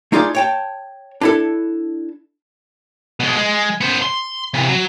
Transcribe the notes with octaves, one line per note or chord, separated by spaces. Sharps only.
A3 D#4 F4 G#4 D5
C#5 G5 A5
D4 E4 A4
B2 G#3
G#3
B3 C5
C6
C3 E3
F#3